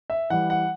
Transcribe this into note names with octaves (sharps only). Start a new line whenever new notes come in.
E5
E3 G3 F#5
F#5